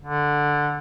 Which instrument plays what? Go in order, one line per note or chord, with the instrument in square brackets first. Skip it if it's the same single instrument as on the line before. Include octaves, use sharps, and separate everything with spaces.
[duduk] D3